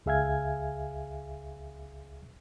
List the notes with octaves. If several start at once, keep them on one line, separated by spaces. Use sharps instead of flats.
C#2 G#4 E5 F5 G#5 G#6